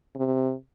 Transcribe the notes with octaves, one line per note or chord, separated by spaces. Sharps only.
C3